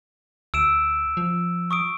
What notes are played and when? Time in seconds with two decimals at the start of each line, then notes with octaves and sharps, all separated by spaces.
0.54 D2 E6 D7 E7
1.17 F3
1.71 C#6 D#6 D7